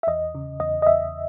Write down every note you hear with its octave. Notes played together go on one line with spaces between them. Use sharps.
E5
E2 D#5
C#3
E2 D#5
D#5
E2 E5